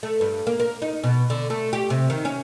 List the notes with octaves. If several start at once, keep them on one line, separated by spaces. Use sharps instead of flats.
A3
G2
A#3
A#4
D#4
B2
D3
A3
G4
C3
D#3
C#4